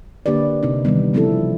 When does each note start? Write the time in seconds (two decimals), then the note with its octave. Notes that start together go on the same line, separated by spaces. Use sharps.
0.26 D3 A#3 D4 G4 B4 D5
0.63 C3 C4 D#4
0.85 D#3 E3 G3 B3
1.14 C#3 F3 B3 C4 E4 A4